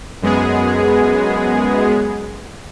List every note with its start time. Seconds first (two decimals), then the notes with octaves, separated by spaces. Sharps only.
0.22 F#2 G#3 B3 G#4